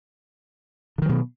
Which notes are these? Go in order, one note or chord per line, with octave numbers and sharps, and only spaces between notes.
B2 D3 D#3 F#3